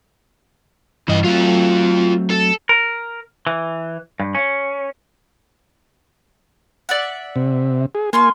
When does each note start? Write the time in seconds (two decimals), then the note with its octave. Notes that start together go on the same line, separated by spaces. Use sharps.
1.08 G2 C#3 E3 D#5
1.24 F#3 A3 C4 F4 A4
2.31 A4
2.69 A#4
3.47 E3
4.20 G2
4.35 C#4
6.89 D5 E5 F#5
7.36 C3
7.95 G#4
8.13 A#3 F4 G#5 C6 C#6